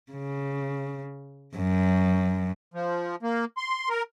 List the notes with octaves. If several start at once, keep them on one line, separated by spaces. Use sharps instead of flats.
C#3
F#2
F3
A#3
C6
A#4